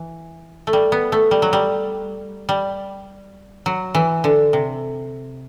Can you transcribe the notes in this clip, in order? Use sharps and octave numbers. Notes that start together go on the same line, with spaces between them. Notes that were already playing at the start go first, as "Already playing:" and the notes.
Already playing: E3
A3
G3
B3
A3
G3
F#3
G3
G3
F#3
E3
D3
C3